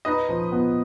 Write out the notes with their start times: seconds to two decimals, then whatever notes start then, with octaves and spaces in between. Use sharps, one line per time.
0.05 D#4 B4 D#5
0.29 F3
0.52 B3